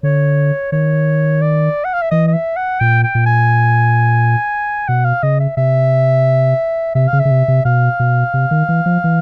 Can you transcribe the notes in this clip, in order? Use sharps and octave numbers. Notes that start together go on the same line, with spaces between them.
D3 C#5
D#3 C#5
D5
F#5
F5
E5
E3 D#5
D#5
E5
F#5
A#2 G5
G5
A#2
G#5
B2 F#5
F5
C#3 D#5
E5
C3 E5
C3 E5
F5
C#3
E5
C#3
C3
C3
B2 F5
B2
C3
D#3
E3
F3
E3